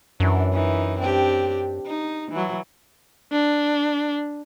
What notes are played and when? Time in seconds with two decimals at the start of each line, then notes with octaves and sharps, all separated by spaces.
0.20 F#2 E3 D4
0.52 E3 D#4
0.99 C4 D4 G4
1.86 D#4
2.32 E3 F#3
3.32 D4